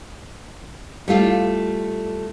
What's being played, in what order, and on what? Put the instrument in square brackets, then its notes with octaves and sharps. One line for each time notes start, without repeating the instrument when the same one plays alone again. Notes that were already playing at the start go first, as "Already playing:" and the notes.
[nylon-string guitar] G3 A3 F4